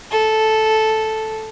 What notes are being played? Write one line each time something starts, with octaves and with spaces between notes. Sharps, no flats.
A4